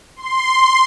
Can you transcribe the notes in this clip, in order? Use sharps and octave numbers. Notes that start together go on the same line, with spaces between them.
C6